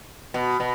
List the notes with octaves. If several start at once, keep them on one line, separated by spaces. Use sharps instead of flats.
B2
B2